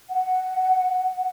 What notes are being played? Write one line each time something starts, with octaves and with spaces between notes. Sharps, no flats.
F#5